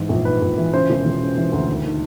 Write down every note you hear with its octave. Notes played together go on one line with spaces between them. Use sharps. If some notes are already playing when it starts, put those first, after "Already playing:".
Already playing: G#2 E3
A#1
G#2 B4
A#1
E3
C#3 C5
E1
E1
C#3
E3
D2
D#2
D#3